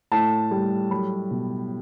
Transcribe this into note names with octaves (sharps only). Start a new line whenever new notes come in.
A2 A5
G3
F#3 B5
B2